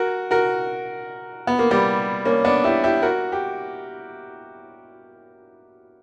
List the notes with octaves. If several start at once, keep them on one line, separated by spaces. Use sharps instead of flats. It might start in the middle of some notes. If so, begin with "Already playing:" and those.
Already playing: F#4 A#4
F#4 A#4
B3
A#3
G3 B3
A#3 C#4
B3 D4
E4 G4
E4 G4
F#4 A#4
G4